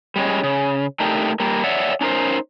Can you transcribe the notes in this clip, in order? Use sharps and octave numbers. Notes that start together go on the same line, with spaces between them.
G3 G#3 C#4
C#3
A3 D4 D#4 G4 A#4
G3 A#3
C#5 D5 E5 F#5
C#4 D#4 A#4 C5